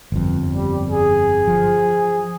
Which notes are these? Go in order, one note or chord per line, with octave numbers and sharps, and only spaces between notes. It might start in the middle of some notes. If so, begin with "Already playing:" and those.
G1 F2
G3
G#4
F3